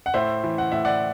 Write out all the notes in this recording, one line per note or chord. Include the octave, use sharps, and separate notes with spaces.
F#5
A2 C5 E5
E3
F#5
A2 E5
D5 F#5